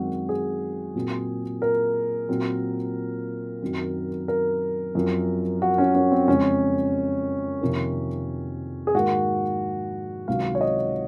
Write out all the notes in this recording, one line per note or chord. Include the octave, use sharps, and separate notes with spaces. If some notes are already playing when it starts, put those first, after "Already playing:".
Already playing: F#2 D#3 G#3 C4 F#4
G#4
A#2 F#3 C4
A#4
A#2 F#3 C4
F#2 D#3 F#3 C4
A#4
F#2 F3 C4
F#4
C#4
C#4
C4
F2 C#3 G#3 C4 C#4
F2 C3 D#3 A#3
G#4
G#2 D#3 A#3 F#4
C#2 C3 D#3 F#3 F5
C#5
D#5